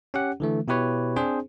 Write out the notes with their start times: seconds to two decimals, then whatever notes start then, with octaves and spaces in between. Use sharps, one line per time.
0.14 C#4 G4 F#5
0.40 D3 E3 A3
0.68 B2 E4 G4 B4 C#5
1.16 C4 D4 G#4 C5